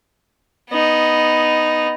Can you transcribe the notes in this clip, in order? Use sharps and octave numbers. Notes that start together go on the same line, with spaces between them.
B3 D#4